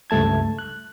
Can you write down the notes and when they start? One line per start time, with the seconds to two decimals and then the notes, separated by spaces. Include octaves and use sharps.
0.10 C#2 G2 A3 A5 G#6
0.59 F#6